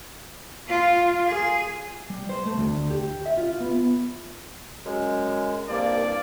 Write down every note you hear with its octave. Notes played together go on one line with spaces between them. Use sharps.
F4
G#4
G3
C5
A3
D2
G4
E5
F4
B3
F#2 G#3
C2 G2 A#3 D5